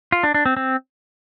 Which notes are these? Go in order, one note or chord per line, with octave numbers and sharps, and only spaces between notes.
F4
D4
D4
C4
C4